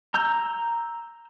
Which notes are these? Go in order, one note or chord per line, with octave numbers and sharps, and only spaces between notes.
A#5 E6 G6